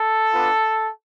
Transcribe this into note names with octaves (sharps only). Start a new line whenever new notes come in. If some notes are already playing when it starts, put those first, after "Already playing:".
Already playing: A4
B3 D4 F4